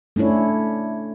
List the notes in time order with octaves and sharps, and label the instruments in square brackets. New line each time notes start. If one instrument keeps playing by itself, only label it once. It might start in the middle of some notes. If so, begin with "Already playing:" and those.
[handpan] A3 C#4 D4 E4 C#5